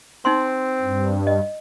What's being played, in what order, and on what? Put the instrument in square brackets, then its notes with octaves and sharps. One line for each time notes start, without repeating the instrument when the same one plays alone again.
[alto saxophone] C4 [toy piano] D#4 C6
[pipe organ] G2
[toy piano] D#5